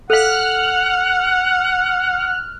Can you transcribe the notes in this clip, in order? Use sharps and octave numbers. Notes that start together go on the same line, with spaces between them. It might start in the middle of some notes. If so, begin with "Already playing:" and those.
A4 F5 F#5 F6 F#6